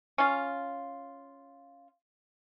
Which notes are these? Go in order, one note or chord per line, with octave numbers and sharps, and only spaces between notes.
C#4 F4